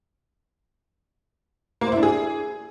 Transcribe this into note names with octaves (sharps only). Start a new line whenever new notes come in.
A#3
C5
E4
D4
G#4